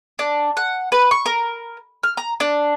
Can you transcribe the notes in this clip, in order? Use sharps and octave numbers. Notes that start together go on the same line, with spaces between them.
D4
F#5
B4
C#6
A#4
F6
A#5
D4